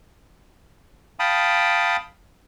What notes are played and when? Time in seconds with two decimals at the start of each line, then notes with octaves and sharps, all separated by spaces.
1.19 F5 G5 A5 B5 D#6